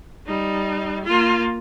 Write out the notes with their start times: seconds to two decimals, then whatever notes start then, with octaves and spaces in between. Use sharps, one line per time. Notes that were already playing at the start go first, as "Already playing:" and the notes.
0.26 G3 D#4
1.04 A#3 F4